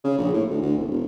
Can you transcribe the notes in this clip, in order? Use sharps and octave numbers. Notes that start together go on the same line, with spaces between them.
C#3
A#1
A2
D2
D2
E1
E1